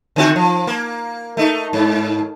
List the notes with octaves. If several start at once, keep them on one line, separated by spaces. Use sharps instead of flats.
D3 C4 F#4
F3
A#3
A3 D#4
G#2